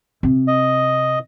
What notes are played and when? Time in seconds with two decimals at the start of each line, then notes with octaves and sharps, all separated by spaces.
0.23 C3
0.48 D#5